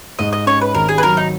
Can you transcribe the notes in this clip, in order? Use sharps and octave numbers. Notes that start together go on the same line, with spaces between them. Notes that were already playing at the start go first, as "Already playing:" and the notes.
G#2 D#5
D#5
C#4 C#5
B4
G#1 A#4
G#4
B4
F#3 A#4
D#4